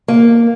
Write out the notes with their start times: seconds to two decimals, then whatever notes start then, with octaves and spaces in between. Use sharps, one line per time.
0.08 A#3